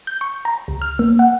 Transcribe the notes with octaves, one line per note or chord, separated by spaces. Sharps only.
G6
C#6
A#5
C#2
F6
A#3
F#5